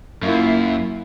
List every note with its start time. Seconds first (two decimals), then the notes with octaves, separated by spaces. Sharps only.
0.22 F#2 A#3 E4 F4